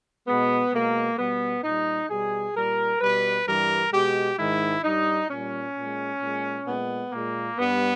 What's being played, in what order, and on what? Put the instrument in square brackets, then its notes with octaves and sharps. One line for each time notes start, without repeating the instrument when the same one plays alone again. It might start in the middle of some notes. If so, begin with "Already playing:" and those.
[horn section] B2 G#3 B3
B2 G#3 A#3
B2 G3 B3
A#2 G3 D#4
B2 G3 G#4
A#2 G3 A#4
B2 G3 B4
G2 E3 G3 A#4
B2 G#3 G4
G#2 D#3 G#3 E4
G2 G3 D#4
A#2 G3 C#4
A#2 G#3
A#2 G#3
A#2 G#3 B3
A#2 G#3 A#3
G2 G3 B3